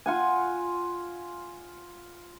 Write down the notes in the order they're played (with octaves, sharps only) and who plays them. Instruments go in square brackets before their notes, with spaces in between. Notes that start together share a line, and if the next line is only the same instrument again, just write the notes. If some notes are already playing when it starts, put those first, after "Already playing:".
[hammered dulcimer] F4 F#5 G#5